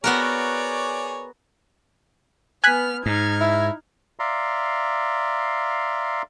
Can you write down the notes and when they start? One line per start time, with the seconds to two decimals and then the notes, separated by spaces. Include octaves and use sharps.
0.04 B3 F#4 G#4 A#4 C#5 D5
2.64 B3 G#5 F6 F#6 B6
3.06 G#2 D#4 F6 G#6
3.41 E4
4.19 D5 E5 F5 A#5 C6